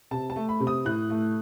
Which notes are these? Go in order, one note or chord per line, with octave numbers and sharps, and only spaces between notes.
C3 A5
A5
A3
B5
C3
D#6
A2 F#6
A3